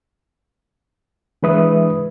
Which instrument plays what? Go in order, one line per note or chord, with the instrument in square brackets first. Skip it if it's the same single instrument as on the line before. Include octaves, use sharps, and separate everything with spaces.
[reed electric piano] E3 G#3 D4 B4 E5 D#6